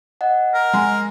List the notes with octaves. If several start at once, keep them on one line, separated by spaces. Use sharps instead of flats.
D#5 F#5
A#4
G#3